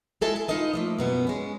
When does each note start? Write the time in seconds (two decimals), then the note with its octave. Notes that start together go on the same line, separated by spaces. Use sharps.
0.21 G#3 E4 A4 G#5 A5
0.36 G#5
0.48 D#4 F4 B4 D#5 A5
0.73 F3 A3 A#3
0.99 F#2 B2 B3
1.27 G#3 C#4